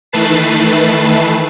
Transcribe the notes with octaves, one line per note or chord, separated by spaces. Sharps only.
D#3 E3 A3 B4 A5 C7